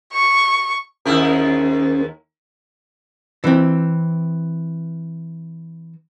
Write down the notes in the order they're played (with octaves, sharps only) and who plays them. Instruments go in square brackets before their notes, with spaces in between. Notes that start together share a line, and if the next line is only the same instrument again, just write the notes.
[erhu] C#6
[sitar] D#2 E4 A#4 [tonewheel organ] C#4 G#4 C5
[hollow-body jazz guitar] E3 C4